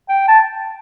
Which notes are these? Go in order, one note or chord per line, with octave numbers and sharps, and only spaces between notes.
G5
A5